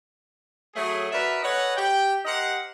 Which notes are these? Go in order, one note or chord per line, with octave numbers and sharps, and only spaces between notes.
F#3 A3 G#4
F#4 A#4 B4 D5 E5
A4 B4 C#5 D#5 F#5
G4 G5
G4 A#4 C5 D#5 F#5